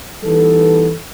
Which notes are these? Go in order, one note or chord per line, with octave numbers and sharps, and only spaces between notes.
E3 G3 B3 D#4 A4